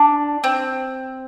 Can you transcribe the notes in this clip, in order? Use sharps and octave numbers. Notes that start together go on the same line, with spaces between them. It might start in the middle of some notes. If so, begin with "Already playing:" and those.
Already playing: D4
C4